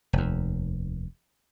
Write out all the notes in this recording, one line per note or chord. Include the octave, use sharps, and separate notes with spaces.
F1 D#2